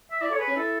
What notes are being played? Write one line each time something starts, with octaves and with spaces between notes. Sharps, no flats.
E5
E4 D5
A4
C#5
G#4 B4
C#4
E4 A4